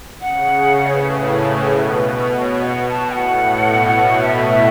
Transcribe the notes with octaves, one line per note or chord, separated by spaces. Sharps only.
C#3 F#5
C#5
A2 B4
B4
B2
C#5
F#5
B2
A5
A2 F#5
B2
B2 F#5
E5